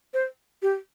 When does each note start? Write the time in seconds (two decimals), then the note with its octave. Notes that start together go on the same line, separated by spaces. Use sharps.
0.14 C5
0.62 G4